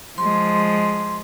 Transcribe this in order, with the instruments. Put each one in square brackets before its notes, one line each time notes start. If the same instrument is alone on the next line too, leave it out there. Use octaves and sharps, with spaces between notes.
[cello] F3 G#3 [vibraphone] C6